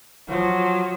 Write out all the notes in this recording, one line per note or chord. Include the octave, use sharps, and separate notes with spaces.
F3 F#3